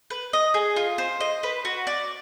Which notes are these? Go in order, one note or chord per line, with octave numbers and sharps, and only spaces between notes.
B4
D#5
G#4
F4
C5
D#5
B4
F#4
D5